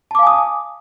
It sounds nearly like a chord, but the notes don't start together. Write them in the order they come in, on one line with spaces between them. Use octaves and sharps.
A5 D6 F5 G#5 D#6